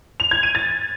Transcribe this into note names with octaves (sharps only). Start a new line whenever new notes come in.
F7
G#6
D#7
A6